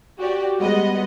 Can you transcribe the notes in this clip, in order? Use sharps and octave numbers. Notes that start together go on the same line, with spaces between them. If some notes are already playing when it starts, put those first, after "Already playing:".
F#4 G4 D5
G3 G#3 B3 D#5 F#5